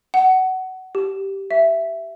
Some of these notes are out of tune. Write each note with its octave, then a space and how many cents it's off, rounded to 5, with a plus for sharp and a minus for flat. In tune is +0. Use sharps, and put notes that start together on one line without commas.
F#5 +20
G4 -10
E5 +10